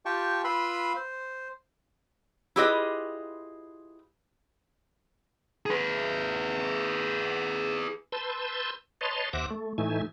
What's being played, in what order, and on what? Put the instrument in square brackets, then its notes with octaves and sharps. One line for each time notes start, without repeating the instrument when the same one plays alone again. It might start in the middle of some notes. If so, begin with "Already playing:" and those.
[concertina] F4 G4 G5 A5 C#6
F4 B4 B5 C6 E6
C5
[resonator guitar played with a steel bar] E4 F4 G4 G#4 B4 D#5
[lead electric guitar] G#4 B4
[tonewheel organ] B4 A5 C6 E6 G6
B4 C#5 D#5 A5 C6
D#2 C5 E5 F#5 D6 A#6
A3
A2 E3 A3 D#4 E5 G#5